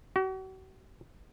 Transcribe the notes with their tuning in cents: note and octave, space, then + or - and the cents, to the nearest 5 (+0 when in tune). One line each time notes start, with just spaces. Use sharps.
F#4 +40